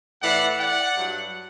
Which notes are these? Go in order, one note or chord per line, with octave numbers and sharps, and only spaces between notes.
A2 E3 D5 F#5
D5 F#5
G2 F#3